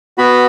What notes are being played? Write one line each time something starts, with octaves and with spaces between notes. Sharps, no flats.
B3 F#4 B5